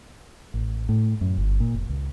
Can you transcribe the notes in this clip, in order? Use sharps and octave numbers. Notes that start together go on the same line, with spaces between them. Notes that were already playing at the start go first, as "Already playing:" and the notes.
A1
A2
F#2
G1
A#2
F1
C#2